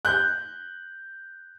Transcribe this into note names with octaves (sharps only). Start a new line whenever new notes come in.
F#6 G6